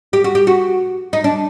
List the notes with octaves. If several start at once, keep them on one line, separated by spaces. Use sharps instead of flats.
G4
F#4
G4
F#4
D#4
D4